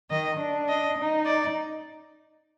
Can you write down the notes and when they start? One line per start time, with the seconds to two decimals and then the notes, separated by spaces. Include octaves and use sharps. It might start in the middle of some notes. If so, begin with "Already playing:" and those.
0.11 D#3 D#5
0.39 D4
0.69 D#5
0.97 D#4
1.26 D5